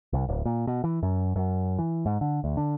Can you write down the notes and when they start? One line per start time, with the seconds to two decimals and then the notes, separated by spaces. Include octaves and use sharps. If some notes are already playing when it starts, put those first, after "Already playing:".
0.13 C2
0.28 D1
0.45 A#2
0.67 B2
0.84 E3
1.03 F#2
1.36 F#2
1.79 E3
2.06 G#2
2.21 D3
2.44 D2
2.57 D3